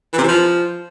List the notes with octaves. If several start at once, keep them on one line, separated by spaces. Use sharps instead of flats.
E3
C3
E3
F3